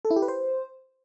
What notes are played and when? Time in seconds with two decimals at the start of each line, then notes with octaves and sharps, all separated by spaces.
0.05 A4
0.11 E4
0.16 G4
0.22 B4
0.28 C5